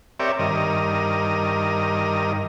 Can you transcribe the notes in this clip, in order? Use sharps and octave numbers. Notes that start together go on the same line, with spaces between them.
C4 G4 A#4 C#5 D5 E5
G2 D#3 A#4 D#5